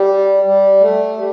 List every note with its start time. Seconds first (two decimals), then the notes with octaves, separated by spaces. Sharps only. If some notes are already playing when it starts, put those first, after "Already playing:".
Already playing: G3
0.43 G3
0.80 A3
1.17 G3